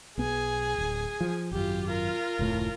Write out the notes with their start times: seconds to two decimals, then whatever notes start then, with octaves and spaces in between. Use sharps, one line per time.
0.18 B1 B3 G#4 G#5
0.78 D1
1.21 F3
1.51 G#1 F#2 F4 G4
1.86 F4 A#4
2.39 F1 D2 A2